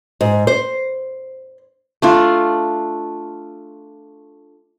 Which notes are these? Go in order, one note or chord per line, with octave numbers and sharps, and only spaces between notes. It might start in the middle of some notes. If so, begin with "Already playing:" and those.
G#2
C5
A3 D4 F4